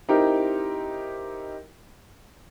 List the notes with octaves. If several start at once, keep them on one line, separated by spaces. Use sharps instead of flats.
C4 D#4 E4 G4 A#4